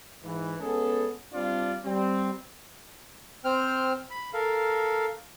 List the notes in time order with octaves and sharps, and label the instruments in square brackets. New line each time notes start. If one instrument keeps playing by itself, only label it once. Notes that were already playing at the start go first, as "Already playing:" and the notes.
[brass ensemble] G#2 E3
G#3 B3 C#4 G#4 A4
G3 C4 D4 F4 D5
G3 C4
[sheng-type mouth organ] C4 C5 G5 F6
B5
A4 A#4 F5